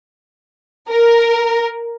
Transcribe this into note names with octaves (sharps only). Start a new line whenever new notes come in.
A#4